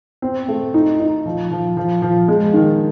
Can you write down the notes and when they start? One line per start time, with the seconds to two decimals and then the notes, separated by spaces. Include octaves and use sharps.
0.22 C4
0.48 A3
0.74 D#4
1.00 D#4
1.26 F3
1.51 F3
1.77 F3
2.02 F3
2.28 G#3
2.54 D#3